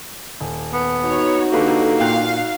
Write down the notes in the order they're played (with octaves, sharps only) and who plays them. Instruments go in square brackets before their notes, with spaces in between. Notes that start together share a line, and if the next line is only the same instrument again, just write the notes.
[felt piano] D#1
[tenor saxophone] B3
[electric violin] D#4 F#4 [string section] C#5
[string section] D3 [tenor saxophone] A#3 [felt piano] G4 B4 C#6
[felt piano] A#2 G5 F#6 [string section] F5